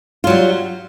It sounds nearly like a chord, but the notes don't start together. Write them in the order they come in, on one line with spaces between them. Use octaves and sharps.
F4 F#3 G3